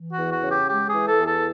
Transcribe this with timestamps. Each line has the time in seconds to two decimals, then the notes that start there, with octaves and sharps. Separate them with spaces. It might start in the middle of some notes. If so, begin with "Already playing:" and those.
Already playing: E3
0.12 F#4
0.18 E2
0.32 F#4
0.44 C#3
0.50 G4
0.69 G#3 G4
0.88 G#4
0.94 E3
1.07 A4
1.19 E2
1.26 A4